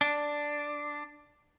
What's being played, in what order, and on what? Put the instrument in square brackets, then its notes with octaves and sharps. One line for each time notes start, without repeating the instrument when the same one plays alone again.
[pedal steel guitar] D4